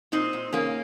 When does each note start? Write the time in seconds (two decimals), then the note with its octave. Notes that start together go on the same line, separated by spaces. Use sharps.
0.12 A#2 C4 D#4
0.33 A#2
0.53 C#3 A#3 C#4